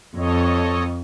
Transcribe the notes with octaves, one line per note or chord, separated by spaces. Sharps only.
F2 A4 C#5 D#5